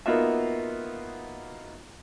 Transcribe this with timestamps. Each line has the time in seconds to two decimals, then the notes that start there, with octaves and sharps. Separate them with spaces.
0.06 A#3 B3 D#4 F4 F#4 E5